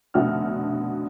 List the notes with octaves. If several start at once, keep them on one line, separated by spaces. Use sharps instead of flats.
F1 B2 D3 F#4 E5 F6